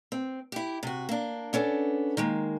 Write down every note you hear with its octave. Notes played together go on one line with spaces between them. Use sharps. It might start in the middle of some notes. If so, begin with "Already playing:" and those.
C4
E4 G4
C3 F#4
A#3 D4
B3 C#4 D4 A4
D#3 G#3 A#3